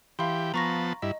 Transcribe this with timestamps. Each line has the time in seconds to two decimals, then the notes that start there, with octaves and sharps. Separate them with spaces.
0.19 E3 G4 F5 B5 C6
0.54 F3 B3 A5 A#5 C#6 A#6
1.02 G2 E4 D#5